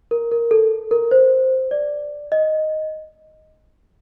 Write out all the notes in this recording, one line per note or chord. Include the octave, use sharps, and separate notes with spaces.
A#4
A#4
A4
A#4
C5
D5
D#5